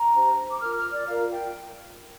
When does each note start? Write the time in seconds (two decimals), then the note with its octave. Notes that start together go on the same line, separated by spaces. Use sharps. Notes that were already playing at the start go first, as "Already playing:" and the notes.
Already playing: A#5
0.13 D4 G4 C5
0.49 D6
0.60 F4 A#4 F6
0.76 F6
0.92 D5
1.07 F4 A#4 F5
1.30 G5